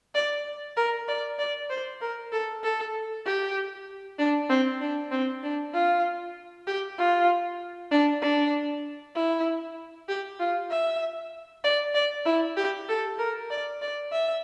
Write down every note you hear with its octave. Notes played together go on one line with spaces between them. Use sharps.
D5
A#4
D5
D5
C5
A#4
A4
A4
G4
D4
C4
D4
C4
D4
F4
G4
F4
D4
D4
E4
G4
F4
E5
D5
D5
E4
G4
A4
A#4
D5
D5
E5